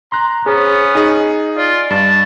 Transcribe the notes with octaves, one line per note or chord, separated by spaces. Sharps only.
A#5 C6 F#6
B3 C#4 G#4 C5
D#4 G#4 D#5 G#5
F4 D5
G2 A5